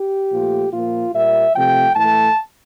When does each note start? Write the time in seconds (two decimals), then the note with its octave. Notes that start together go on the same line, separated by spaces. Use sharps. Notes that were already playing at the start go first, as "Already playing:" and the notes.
Already playing: G4
0.32 A#2 F3 A3
0.73 A#2 F3 A#3 F4
1.14 A#2 G3 A#3 E5
1.55 C3 F3 A3 G5
1.95 A2 E3 A3 A5